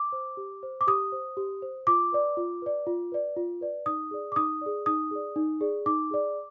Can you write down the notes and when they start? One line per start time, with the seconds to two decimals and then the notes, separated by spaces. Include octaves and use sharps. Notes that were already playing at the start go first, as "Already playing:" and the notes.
Already playing: D6
0.12 C5
0.37 G4
0.63 C5
0.81 D6
0.87 G4 D#6
1.12 C5
1.37 G4
1.62 C5
1.87 F4 D6
2.12 B4 D5
2.37 F4
2.62 B4 D5
2.87 F4
3.12 B4 D5
3.37 F4
3.61 B4 D5
3.86 D#4 D#6
4.11 G#4 D5
4.32 D6
4.36 D#4 D#6
4.62 G#4 D5
4.86 D#4 D#6
5.11 G#4 D5
5.36 D#4
5.61 G#4 D5
5.86 D#4 D6
6.11 G#4 D5